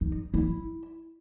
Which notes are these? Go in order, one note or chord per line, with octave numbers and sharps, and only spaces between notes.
D#4
E4